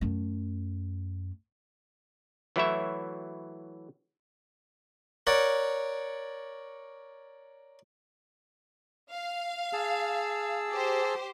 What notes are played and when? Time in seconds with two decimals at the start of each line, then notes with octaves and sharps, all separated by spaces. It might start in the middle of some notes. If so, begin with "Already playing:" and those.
0.01 F#2 A3
2.56 E3 F#3 A3 E4 C#5 E5
5.27 A#4 C#5 D5 F#5
9.12 F5
9.73 G#4 A5 E6
10.71 G4 C5